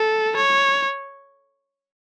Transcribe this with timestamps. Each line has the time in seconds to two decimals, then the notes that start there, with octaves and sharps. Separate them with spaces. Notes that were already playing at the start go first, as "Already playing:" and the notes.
Already playing: A4
0.36 C#5